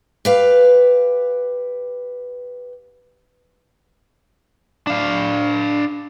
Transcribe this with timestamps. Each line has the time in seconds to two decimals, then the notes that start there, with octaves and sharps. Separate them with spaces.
0.25 G4 B4 F5
4.87 D4 F5